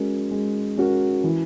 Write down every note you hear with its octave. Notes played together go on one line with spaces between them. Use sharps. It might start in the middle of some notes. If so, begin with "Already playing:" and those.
Already playing: G#3 C#4 F#4 A#4
G#3
C#4 F#4 A#4
E3